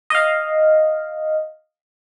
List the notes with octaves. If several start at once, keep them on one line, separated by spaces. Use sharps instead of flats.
D#5 F5